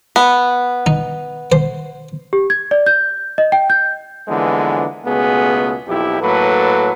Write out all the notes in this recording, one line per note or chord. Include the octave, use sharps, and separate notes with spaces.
B3
D#4
C5
G4
G#6
D5
G6
D#5
G5
G6
D3 E3 F3 G#3 A#3 B3
C#2 B2 A3 B3 G#4
B1 F2 E4 G4
A2 F#3 A#3 A4 B4